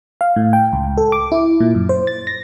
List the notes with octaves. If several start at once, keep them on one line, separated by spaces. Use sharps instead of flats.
F5
A2
G5
C#2
A4
D6
E4
A#2
F#2
C5
A6
A#6